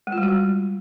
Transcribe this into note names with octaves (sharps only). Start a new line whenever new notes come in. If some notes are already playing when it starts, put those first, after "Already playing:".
G#3
F4
G3
F#4
G3